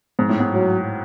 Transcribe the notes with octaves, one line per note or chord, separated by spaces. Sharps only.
G#2
A2
G#2
F#3